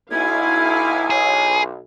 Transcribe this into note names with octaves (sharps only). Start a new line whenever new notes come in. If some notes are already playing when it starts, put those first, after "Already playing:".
B1 E4 F5 G#5 G#6
G#4 C#5